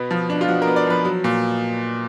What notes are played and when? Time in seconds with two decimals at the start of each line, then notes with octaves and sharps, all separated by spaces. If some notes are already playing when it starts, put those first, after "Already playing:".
Already playing: B2 B3
0.11 F3
0.30 D4
0.41 F4
0.48 F3 F#4
0.62 A#4
0.67 B3
0.76 D5
0.87 F3 B4
1.05 F#3
1.24 A#2